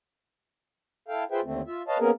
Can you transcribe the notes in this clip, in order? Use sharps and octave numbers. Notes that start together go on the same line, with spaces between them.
E4 A4 F5 G5
F4 G#4 B4 C5 E5 G5
D#2 D3 A3 C4
F4 E5
B4 C#5 D#5 F5 A5
A#3 B3 C#4 G#4 A#4